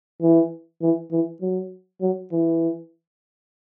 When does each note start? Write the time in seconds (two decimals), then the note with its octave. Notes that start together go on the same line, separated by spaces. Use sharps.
0.22 E3
0.82 E3
1.12 E3
1.42 F#3
2.02 F#3
2.32 E3